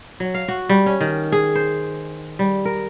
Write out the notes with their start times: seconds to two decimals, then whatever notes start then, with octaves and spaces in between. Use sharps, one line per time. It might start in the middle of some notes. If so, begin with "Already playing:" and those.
0.20 F#3
0.34 F5
0.48 F#4
0.69 G3
0.86 C#4
1.01 D#3
1.32 G#4
1.55 C5
2.39 G3
2.65 A#4